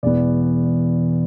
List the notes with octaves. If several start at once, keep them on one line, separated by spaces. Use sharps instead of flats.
E1 E2 E3 B3 D5